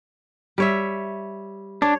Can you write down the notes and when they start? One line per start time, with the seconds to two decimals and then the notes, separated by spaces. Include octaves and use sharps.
0.58 G3 C#5 E5
1.82 D4 C#5